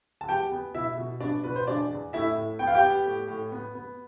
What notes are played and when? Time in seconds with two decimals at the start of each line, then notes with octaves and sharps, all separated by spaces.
0.21 A5
0.29 E2 G4 G5
0.51 B3
0.74 B2 E4 E5
0.97 B2
1.21 B3 D4 D5
1.44 B2 B4
1.56 C5
1.67 E2 D4 D5
1.91 E2
2.13 A2 E4 E5
2.36 A2
2.59 B3 G5
2.67 F5
2.75 G4 G5
2.83 B3
3.05 A2
3.28 A2
3.52 B3
3.75 B3